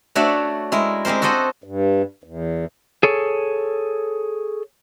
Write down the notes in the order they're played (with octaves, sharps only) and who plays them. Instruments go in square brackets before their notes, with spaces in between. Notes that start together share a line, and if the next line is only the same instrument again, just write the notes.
[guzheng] A3 D4 F#4 C#5 D5 E5
G#3 E4 A#4
G#3 C4 G4 A#4 C5
F#4 A4 C5 D#5 F#5
[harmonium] G2
E2
[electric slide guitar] G#4 A4 C#5